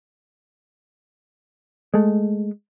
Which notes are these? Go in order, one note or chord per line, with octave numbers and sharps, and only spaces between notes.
G#3 A3